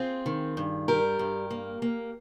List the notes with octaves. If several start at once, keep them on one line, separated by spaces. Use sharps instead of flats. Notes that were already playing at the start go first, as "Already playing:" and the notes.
Already playing: C4 F4 G#4
D#3
G2
G3 G4 A#4
G2
A#3
A#3